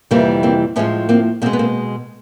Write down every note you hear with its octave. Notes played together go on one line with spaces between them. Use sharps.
F2 C3 E3 G3 A#3
A#3 C4
A2 F3 G#3 B3 C#4
A#3 C4
B2 G#3 A#3 C4
B3
A#3 C4